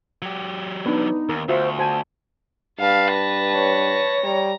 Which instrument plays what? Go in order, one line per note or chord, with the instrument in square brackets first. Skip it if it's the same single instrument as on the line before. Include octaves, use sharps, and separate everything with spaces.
[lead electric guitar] F#3 G4
[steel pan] B3 D4 B4 [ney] D#4
[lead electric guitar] D#2 [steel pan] A#4
[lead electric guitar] D2 [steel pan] F4 F#4 E5 [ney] C5
[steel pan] F#4 C5 G#5 [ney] A5
[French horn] G2 [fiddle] B4 A5 [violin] F5
[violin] A#6
[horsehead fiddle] C#5
[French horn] G3 [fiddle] A#5